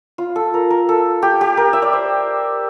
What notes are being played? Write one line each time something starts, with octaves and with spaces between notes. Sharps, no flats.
F4
A4
A#4
A#4
A4
G4
G4
A#4
E5
D5
C5